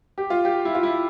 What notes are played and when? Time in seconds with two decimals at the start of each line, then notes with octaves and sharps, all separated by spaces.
0.18 G4
0.30 F4
0.45 G4
0.65 E4
0.75 F4
0.83 E4